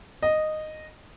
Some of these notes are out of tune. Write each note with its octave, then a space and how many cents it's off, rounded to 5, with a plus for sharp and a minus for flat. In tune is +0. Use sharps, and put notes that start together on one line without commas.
D#5 -10